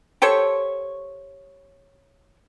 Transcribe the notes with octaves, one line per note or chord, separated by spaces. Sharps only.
G4 A4 C5 C#5